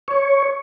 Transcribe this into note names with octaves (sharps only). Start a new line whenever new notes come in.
C#5